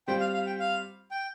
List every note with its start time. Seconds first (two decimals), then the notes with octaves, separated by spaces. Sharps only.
0.08 G3 C4 F4 C5 G5
0.20 F5
0.34 F5
0.46 G5
0.60 F5
1.11 G5